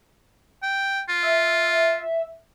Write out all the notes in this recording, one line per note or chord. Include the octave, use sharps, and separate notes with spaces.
G5
F4
E5